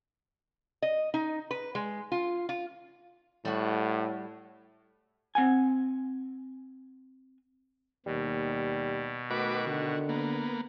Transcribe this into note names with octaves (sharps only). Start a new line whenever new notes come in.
D#5
D#4
B4
G#3
F4
F4
A2 G3 F#4
C4 F#5 G#5
D#2 B2 G3
D#3 A3 F#4 B4 D6
D3 F#4
A#3 B3